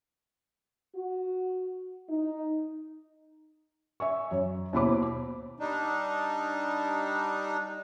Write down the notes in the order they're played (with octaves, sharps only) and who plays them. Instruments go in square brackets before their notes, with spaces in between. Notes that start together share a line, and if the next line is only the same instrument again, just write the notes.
[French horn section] F#4
D#4
[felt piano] E5 G#5 C#6
F#2 C#5
D#2 B2 E4 C5 B5 D6
[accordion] G3 D4 D#4